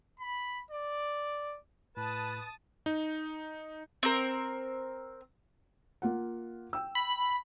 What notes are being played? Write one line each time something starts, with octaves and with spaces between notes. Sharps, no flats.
B5
D5
A2 B4 A5 D#6
D#4
C4 A#4
A#3 F4 F#5
G5 E6
B5